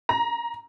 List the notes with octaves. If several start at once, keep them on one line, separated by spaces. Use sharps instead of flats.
A#5